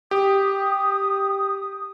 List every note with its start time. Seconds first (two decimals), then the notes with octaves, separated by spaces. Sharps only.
0.11 G4 D#6